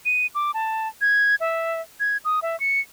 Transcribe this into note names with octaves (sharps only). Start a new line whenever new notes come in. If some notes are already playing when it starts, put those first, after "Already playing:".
D#7
D6
A5
G#6
E5
G#6
D#6
E5
C#7